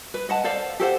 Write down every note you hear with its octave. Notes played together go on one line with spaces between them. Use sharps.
B4
D#5 F#5 A5
A4 C5 D5 F5
G4 A4 C5 F#5